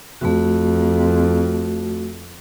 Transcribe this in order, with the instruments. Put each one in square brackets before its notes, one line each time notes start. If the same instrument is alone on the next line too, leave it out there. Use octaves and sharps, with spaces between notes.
[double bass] F2 [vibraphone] A3 F#4